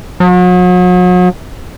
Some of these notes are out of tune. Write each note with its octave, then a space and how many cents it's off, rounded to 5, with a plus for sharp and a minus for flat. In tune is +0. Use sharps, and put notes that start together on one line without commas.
F#3 -40